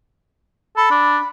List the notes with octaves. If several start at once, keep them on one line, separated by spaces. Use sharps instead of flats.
A4 B5
D4